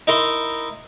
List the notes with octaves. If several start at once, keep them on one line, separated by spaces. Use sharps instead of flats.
D#4 E4 A#4 C6